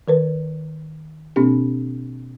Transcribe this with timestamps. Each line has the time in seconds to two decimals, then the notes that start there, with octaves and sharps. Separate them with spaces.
0.08 D#3 A#4 B4
1.36 B2 A#3 C4 D4 G4